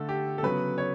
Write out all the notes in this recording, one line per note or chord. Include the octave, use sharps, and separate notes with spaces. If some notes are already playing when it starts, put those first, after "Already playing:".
Already playing: D3 A3 A4
G4
A4
C#3 F#3 B3 B4
C#5